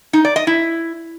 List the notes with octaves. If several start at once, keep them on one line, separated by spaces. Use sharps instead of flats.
D#4
D5
D#5
E4